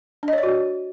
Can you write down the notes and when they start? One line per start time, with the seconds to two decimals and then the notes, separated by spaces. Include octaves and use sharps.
0.23 D4
0.28 D#5
0.33 C#5
0.38 D5
0.43 F#4